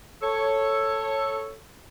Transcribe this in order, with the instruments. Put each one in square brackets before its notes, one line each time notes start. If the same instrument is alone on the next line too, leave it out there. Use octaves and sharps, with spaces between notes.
[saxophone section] A4 C#5